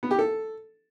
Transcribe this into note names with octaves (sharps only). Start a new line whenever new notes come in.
B3
G4
A4